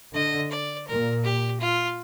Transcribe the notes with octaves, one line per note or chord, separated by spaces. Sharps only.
D3 D#5
D5
A#2 A#4
G4
F4